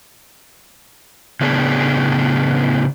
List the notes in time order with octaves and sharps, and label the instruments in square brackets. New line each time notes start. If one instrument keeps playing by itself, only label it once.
[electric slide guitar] A2 C#3 B3 D4 G#4